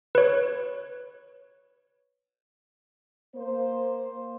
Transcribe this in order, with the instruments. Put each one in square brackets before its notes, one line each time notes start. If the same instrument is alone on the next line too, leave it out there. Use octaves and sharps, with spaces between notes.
[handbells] B4 C#5
[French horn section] A#3 C5